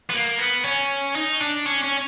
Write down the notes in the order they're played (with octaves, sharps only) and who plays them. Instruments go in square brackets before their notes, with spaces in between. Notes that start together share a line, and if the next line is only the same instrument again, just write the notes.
[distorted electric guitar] B3
A#3
B3
C#4
D#4
D4
C#4
C#4